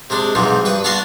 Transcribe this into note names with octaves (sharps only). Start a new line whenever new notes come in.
C3 G#3 D4
B1 G#2 C3 E3 F3 G3
G2 B4 C#6 D#6
B3 D4 F#4 F5 A5 C6